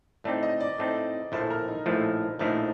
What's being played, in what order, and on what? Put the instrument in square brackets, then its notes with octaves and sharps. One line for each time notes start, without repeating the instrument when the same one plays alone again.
[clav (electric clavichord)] A2 A3 C4 D#4 [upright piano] D5
[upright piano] D#5
D5
[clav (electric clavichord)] A2 A3 C4 D#4
[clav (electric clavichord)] A#1 A2 F3 A3 [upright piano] C5
[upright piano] A#4
D#4
[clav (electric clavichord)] A#1 A2 F3 A3
[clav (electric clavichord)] A#1 A2 F3 A3 D4 [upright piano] D#4